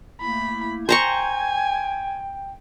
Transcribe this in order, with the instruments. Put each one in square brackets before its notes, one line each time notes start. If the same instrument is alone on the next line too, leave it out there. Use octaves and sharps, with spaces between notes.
[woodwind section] A3 A#3 E4 [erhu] B5
[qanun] C5 A#5 C#6 [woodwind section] G5 [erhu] G#5